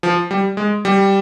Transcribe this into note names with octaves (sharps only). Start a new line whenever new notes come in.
F3
G3
G#3
G3